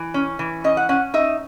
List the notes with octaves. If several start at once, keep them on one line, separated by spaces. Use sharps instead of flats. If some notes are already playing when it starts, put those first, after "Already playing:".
Already playing: E3
C#4
E3
C#4 D#5
F#5
C#4 F#5
D#4 E5